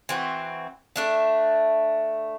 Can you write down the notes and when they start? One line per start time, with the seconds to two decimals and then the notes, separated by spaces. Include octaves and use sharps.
0.09 E3 C4 F#4
0.96 A3 D4 E5